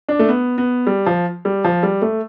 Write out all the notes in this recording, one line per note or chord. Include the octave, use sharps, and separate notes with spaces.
D4
A3
B3
B3
G3
F3
G3
F3
G3
A3